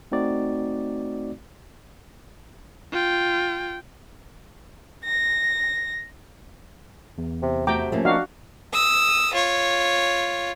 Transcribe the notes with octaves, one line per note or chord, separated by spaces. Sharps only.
A3 C4 D#4 F#4 D5
F4 G5
A#6
E2
C3
C3 A3 F#4 G5 A#5 D6
F3 A3 A#3 C#4
D4 D#4 F#4 F5
D#6 E6
F4 C#5